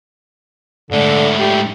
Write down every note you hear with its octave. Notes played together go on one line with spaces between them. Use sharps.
G#2 D3 A3
G4